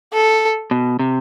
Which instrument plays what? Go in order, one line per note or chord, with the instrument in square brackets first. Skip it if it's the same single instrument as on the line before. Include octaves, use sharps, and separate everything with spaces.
[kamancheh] A4
[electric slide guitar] B2
C3